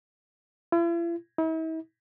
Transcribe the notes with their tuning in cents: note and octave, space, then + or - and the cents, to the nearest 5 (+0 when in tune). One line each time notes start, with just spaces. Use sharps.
E4 +45
E4 -45